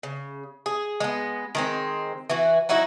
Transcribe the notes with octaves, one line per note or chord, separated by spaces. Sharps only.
C#3
G#4
G#3 B3
D#3 G#3 C4
E3 F#4
F#3 D#4 E4 F#4